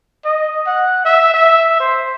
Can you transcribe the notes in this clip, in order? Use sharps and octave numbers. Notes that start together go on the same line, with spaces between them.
D#5
F#5
E5
E5
C5